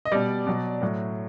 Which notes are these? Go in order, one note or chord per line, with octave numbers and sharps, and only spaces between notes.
D#5
B2 G3 D5
B2 F#3
A2 F#3